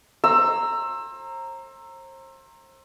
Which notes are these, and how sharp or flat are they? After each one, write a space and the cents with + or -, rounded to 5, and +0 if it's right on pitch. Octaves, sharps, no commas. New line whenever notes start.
C5 +35 A#5 -10 E6 +15